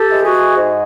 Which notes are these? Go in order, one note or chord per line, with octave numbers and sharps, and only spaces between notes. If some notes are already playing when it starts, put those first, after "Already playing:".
Already playing: G4 A4
E3 G#3
F#4 G#4
G#2